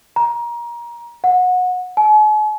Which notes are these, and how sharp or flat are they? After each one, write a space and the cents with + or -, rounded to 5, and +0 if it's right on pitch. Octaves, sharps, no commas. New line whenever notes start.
A#5 +25
F#5 -25
G#5 +45